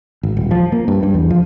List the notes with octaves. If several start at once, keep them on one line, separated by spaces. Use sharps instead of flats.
G#1
D#1
F3
A#3
G2
G2
E2
F3